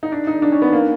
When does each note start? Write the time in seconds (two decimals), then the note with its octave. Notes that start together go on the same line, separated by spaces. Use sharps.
0.03 D#4
0.12 D4
0.27 D#4
0.42 D4
0.52 C#4
0.62 B3
0.73 A#3